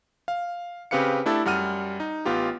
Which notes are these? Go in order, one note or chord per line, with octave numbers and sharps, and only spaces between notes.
F5
C#3 C4 G4 B4 F5 C#7
A3 D4 E4 G4 A4
F#2 G3 F#5 F6 D#7
D#4
A1 B3 F4 G4